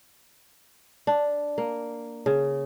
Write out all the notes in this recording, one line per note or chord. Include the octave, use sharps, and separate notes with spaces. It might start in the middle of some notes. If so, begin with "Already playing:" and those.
D4
A#3
C#3